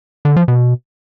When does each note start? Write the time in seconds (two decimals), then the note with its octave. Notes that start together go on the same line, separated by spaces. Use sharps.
0.25 D3
0.36 F3
0.48 B2